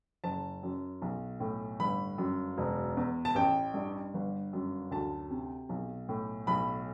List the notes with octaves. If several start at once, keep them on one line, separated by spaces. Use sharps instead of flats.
F#1 A5
F#2
B1
A2
G1 B5
F#2
E1
E2
A5
A1 G5
G2
G1
F#2
D2 A5
C3
B1
A2
B1 B5